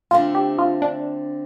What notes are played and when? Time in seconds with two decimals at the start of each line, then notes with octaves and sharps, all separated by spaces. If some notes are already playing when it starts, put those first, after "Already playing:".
0.11 D3 A3 C4 F4
0.35 G4
0.58 F4
0.82 D4